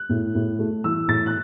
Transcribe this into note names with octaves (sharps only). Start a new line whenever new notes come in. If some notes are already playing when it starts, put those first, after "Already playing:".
Already playing: F#6
A2
A2
A3
E3 E6
A2 A6
F#6